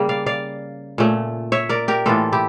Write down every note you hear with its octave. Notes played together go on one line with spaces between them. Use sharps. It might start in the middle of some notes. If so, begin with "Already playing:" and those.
Already playing: C#3 G3 A#3 C#4
D5 F5
D5 F5
A#2 A3 C#4
C#5 E5
A#4 D5
G4 A#4
A2 E3 A#3 F4 A4
E4 G4